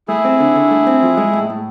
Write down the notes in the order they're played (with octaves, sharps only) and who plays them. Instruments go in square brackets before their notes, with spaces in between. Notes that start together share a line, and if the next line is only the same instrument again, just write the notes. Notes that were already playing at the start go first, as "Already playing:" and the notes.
[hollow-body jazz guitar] A3 [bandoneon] E4 G#4
[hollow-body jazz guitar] C4
D3
D3
A3
C4
F3
G#3
A2
A2